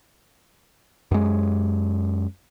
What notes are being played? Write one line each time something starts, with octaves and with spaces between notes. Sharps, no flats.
F#2 G#3